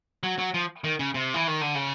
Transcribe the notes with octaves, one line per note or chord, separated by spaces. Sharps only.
F#3
F#3
F3
D#3
C#3
C3
E3
D#3
D3
C#3